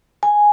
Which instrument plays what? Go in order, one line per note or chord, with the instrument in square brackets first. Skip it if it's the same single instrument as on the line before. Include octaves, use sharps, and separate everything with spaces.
[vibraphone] G#5